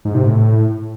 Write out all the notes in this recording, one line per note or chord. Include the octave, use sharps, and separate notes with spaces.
G#2
C3
A2